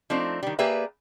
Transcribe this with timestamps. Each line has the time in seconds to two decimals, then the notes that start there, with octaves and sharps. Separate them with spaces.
0.10 F3 A3 C4 D4 D#4
0.43 D#3 G3
0.59 A#3 G4 G#4 B4 D5 E5